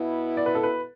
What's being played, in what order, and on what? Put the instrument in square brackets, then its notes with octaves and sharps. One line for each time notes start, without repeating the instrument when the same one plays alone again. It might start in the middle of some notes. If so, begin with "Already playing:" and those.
Already playing: [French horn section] B2 B3 E4
[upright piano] D5
B4
A4
B4